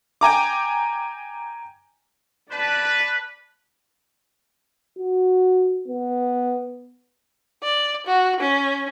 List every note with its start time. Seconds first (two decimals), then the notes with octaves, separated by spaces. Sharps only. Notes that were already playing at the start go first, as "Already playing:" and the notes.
0.21 G5 G#5 A#5 D6
2.51 B4 D5 A5
4.98 F#4
5.87 B3
7.63 D5
8.06 F#4
8.40 C#4